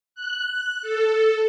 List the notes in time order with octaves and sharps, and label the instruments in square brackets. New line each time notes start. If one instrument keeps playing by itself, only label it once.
[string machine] F#6
A4